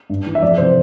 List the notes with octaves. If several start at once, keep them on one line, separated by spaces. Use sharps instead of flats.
G2
E3
E5
F2 D5
C3 E3 C5